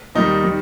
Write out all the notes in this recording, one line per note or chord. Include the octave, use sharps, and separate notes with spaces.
D#2 D#3 G3 D#4
D#3 G3